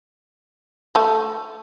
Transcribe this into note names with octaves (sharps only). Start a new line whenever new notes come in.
A3 A4